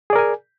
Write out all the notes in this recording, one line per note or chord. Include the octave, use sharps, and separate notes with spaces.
G#4 A#4 D5 G#5